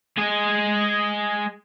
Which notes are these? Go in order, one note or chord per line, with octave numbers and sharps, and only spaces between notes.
G#3 G#4